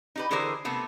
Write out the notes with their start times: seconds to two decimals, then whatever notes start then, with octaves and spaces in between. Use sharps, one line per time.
0.16 D#4 G4 B4
0.31 D3 E3 G4 G#4 A#4 C5
0.65 C3 A3 B3